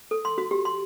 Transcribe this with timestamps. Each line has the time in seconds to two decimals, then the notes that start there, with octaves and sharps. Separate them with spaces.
0.11 A4
0.25 C6
0.38 F#4
0.51 G4
0.65 C6